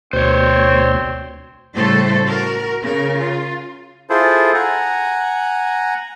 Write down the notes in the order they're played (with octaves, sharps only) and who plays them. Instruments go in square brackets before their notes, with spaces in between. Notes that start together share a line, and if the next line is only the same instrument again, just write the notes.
[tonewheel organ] D2 B2 C6 [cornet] C4 [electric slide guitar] C5 C#5
[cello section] A2 C#3 G3 A3 A4 C5
F#4 A#4
C#3 A#4
F4
[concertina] E4 F4 G#4 A4 C5
F#5 G#5 A#5